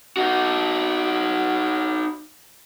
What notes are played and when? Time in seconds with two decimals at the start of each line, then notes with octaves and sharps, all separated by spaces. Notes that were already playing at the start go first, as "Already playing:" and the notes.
0.17 D#4 F#4